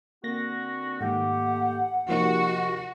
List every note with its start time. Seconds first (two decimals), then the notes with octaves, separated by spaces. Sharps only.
0.24 D3 A#3 C4 F#4 A#6
1.01 G#2 D#3 A3 A#3 G4 F#5
2.09 D#2 C3 F3 A#3 D#4 F#4 C#6